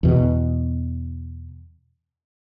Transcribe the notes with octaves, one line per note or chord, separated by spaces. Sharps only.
E2 B2